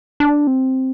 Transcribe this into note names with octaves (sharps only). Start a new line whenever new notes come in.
D4
C4